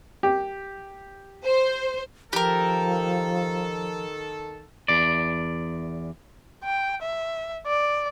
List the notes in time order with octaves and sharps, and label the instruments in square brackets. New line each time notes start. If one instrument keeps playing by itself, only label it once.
[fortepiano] G4
[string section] C5
[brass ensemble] D#3 A4 [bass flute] F3 [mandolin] G4 A#4
[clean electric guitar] E2 D5
[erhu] G5
E5
D5